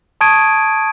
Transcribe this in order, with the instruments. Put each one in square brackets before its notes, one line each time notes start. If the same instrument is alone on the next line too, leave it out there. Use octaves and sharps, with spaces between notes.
[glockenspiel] A5 C#6 D#6 G#6 D7 D#7